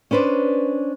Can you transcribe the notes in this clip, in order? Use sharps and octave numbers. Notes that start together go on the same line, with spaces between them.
C#4 D4 B4 C5 D5